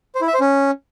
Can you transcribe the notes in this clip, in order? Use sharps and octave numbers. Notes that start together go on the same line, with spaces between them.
C5
E4
E5
C5
C#4